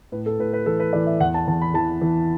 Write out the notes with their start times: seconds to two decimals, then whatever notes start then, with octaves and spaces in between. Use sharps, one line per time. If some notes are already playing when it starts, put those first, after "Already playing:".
0.12 A2 B4
0.26 A4
0.39 A2 B4
0.53 B4
0.66 E3 A4
0.80 B4
0.93 E3 D5
1.07 E5
1.20 E2 F#5
1.34 A5
1.48 E2 A5
1.61 B5
1.74 E3 A5
2.02 E3